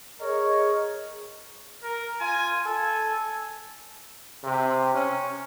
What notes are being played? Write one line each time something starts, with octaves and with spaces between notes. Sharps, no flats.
G#4 A#4 C#5 D#5
A#4
F4 G#5
A4 G#5
C3
C#4